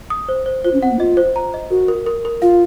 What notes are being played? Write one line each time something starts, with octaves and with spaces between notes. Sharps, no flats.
D#6
C5
C5
F4 C5
C#4
C4 F#5
A#3
F4 D#5
C5
A#5
D#5
F#4 A#4
A#4
A#4
A#4
F4 F5